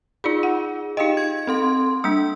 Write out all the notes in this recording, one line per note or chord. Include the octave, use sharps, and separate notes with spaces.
D#4 F4 G#4 D5 B5
F#5
D#4 G4 D#5 F5 G5
G#6
C4 A4 C6
G3 A#3 D4 E6